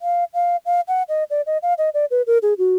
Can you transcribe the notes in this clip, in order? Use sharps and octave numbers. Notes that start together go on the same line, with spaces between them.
F5
F5
F5
F#5
D#5
D5
D#5
F5
D#5
D5
B4
A#4
G#4
F#4